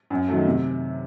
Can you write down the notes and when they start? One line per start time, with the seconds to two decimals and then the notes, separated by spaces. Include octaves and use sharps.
0.10 F#2
0.28 D#3 F#3 A3
0.45 C3